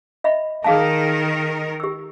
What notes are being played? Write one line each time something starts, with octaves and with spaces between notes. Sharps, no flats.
D#5 E5 B5
D#3 G#4 A#4 F5 A5
G4 E6